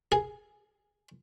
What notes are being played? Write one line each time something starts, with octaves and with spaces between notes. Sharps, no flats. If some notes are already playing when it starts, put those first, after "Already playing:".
G#4